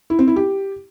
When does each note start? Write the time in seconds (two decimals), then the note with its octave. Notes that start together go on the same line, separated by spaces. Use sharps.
0.10 E4
0.19 C4
0.27 E4
0.36 G4